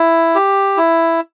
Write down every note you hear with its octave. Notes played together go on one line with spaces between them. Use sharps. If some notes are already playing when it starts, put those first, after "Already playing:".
Already playing: E4
G4
E4